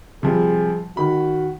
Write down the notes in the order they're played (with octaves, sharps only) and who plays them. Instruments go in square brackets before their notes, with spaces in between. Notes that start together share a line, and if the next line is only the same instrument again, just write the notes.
[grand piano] C3 F3 G3 [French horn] G#4
[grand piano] D#3 B5 [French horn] F#4